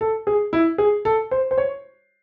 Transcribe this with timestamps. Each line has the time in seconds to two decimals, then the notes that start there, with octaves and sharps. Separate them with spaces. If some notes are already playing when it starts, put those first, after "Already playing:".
0.01 A4
0.27 G#4
0.53 E4
0.78 G#4
1.05 A4
1.31 C5
1.51 C5
1.58 C#5